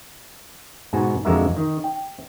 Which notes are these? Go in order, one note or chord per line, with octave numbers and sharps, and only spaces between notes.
G#2 B2 B3 F#4 G#5
F2 D3 G#3 F#4 A#4 E5
D#3
G5